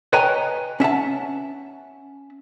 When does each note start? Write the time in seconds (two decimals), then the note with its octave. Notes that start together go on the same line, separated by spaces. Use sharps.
0.13 B4 C#5 D#5 G5 G#5 A#5
0.80 C#4 E5 F#5 A5